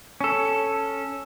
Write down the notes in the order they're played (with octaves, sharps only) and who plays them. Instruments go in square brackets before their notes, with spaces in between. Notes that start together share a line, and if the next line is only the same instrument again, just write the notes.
[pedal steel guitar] C#4 A4